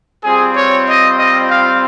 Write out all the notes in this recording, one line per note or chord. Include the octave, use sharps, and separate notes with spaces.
G3 C4 F4 G#4
C#5
D#5
D#5
F5